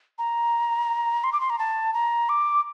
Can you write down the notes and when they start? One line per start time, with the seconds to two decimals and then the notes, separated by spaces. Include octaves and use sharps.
0.18 A#5
1.24 C6
1.33 D6
1.41 C6
1.50 A#5
1.59 A5
1.94 A#5
2.29 D6